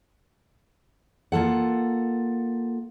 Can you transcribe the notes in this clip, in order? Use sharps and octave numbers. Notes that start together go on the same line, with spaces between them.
A#3 F4 A4 F#5